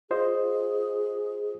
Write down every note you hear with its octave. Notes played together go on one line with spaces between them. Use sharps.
F4 G#4 C5 D#5